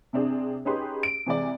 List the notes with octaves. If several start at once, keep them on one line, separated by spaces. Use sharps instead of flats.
C3 C4 D4 G#4
C#4 D#4 G4 G#4 B4 C6
D7
C3 E3 G#3 D5